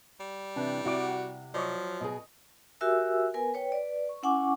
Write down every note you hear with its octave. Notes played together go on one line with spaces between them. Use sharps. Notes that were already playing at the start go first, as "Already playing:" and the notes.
G3
C3 E3 D4
C3 E4 F#4 D5 F#5 D6
F3 F#3 D5 D#5 C#6
B2 G#4 D#5
F#4 G4 A#4 E5 G#5 E6
B3 A#4 B4 G#5
B4 C#5 G5
B4 D5
C#6
C#4 E4 F#5 G#5 C#6 D6